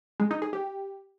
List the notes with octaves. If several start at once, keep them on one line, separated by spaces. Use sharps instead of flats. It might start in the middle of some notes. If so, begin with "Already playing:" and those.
G#3
D#4
G#4
G4